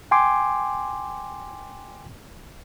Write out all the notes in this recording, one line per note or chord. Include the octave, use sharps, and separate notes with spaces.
G5 G#5 C6 D6